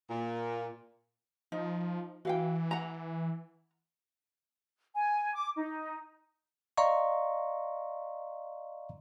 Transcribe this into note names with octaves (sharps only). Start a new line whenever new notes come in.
A#2
F3 D#4
E3 F#4 F5 G5
F#5 A#5
G#5
D6
D#4
D5 D#5 F5 A#5 C6 C#6